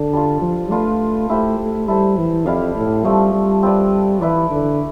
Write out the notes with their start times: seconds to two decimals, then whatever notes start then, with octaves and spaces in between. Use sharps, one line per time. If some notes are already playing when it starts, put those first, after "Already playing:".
Already playing: D3 A4 D5
0.13 G3 D4 F4
0.42 F3
0.70 A3 D4 F4 B4
1.29 A3 E4 G4 C5
1.59 A3
1.88 G3 E4 A4 C5
2.18 E3
2.46 F2 E4 G4 D5 F5
2.75 A2
3.05 F3 G3 A3 C4
3.33 G3
3.63 C4 F4 B4 D5
4.21 E3 E4 B4 D5
4.51 D3